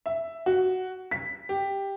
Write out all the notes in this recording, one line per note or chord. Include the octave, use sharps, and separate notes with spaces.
E5
F#4
B6
G4